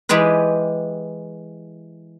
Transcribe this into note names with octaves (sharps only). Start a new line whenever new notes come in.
E3 G#3 G4 G#4 B4